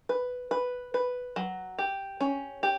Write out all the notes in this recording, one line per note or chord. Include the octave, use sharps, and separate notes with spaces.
B4
B4
B4
F#3
G4
C#4
G4